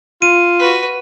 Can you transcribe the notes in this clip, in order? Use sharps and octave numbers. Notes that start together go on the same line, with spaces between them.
F4 D#7
F#4 B4